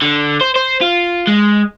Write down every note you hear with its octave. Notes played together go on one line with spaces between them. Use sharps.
D3
C5
C5
F4
G#3